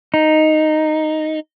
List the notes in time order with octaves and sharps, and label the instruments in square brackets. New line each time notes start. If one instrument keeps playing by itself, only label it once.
[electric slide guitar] D#4